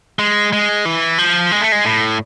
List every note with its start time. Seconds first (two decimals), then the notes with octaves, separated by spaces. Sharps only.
0.19 G#3
0.53 G#3
0.85 E3
1.18 F3
1.51 G#3
1.61 A3
1.72 G#3
1.85 A2